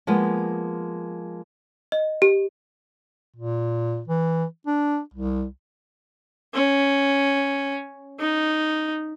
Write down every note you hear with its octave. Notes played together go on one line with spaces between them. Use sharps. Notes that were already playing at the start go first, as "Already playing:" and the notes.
F3 G#3 A#3 B3
D#5
G4
A#2
E3
D4
C2
C#4
D#4